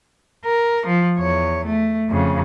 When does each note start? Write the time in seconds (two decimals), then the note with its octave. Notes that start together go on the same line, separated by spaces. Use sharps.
0.45 A#4
0.86 F3
1.18 E2 C#5
1.65 A3
2.10 F2 C#3